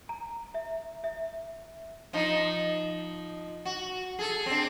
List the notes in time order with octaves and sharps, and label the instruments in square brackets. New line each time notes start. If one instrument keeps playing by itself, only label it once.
[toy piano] A#5
E5
E5
[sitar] F3 D#4
F#4
G#4 A4
C4 D4